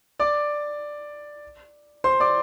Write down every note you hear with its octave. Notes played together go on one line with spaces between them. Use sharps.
D5 D6
C5 C6
D5 D6